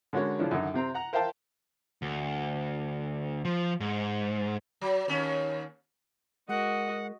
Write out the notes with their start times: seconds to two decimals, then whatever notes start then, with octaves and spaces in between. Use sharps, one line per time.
0.13 D3 G#3 C#4 F#4 A#4 C#5
0.39 C#3 E3 F3 C#4 D4
0.51 F#2 D3 D#3 D#4
0.74 C3 C4 A#5
0.94 F#5 A#5
1.13 A#4 C5 E5 F5 G5 A5
2.02 D2
3.45 F3
3.80 G#2
4.81 F#3
5.08 D#2 C#4
6.49 G#3 F#4 A#4 D#5 F#5